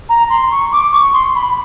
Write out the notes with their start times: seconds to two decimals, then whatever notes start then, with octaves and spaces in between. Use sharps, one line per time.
0.09 A#5
0.30 C6
0.51 C#6
0.72 D6
0.92 C#6
1.13 C6
1.35 B5